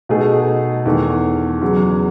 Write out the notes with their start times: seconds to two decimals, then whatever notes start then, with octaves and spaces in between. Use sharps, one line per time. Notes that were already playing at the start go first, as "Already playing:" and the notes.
0.09 B2 A3 D#4 G#4
0.85 E2 D#3 A3
1.62 E2 C#3 F#3